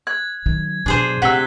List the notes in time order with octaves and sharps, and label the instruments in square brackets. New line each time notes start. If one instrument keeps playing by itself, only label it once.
[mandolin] F#6 [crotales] G#6
[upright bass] D#3 F#3
[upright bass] B2 F#3 [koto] D4 G#4 C5
[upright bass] D2 [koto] C3 [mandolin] F#5 E6 [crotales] F#6 B6 G7